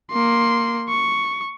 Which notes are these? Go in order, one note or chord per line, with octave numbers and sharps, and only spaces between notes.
A#3 C6
C#6